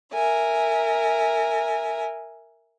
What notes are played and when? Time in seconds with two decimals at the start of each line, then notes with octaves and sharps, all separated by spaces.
0.13 A#4 E5 G#5